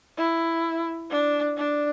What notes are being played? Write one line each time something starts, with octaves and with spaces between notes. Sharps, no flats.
E4
D4
D4